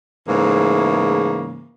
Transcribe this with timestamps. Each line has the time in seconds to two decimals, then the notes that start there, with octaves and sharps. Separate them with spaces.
0.28 G#2 C#3 E3 A3 A#3